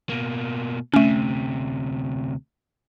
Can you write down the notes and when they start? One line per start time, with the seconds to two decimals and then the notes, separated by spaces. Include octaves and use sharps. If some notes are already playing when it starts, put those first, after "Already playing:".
0.09 B2 A#3
0.94 D2 C3 A3 C#4